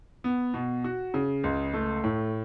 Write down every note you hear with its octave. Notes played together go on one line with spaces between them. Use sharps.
B3
B2
F#4
C#3
C#2
A3
A2